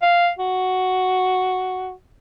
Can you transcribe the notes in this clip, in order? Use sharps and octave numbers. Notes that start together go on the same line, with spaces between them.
F5
F#4